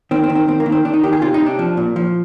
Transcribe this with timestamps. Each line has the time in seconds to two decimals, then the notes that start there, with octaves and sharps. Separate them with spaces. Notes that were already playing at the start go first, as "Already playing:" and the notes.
0.11 D#3 C4
0.24 C4
0.30 D#3
0.35 C4
0.48 D#3 C4
0.60 A#3
0.66 D#3
0.72 C4
0.85 D#3 D4
0.94 D#4
1.03 D#3 G4
1.13 G#4
1.22 C3 F4
1.34 D#4
1.40 C3
1.47 D4
1.59 F3
1.77 A#2
1.96 F3